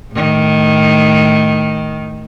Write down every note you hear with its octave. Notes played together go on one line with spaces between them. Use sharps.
A2 D#3